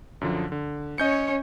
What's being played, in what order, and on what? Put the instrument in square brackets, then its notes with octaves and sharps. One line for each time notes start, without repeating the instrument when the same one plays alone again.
[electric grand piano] F#2 D3 F3
D3
[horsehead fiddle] C#4 C#5 [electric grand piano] D#5 G6 C#7